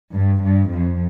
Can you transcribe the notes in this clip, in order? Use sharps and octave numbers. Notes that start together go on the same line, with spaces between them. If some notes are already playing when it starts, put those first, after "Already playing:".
G2
G2
F2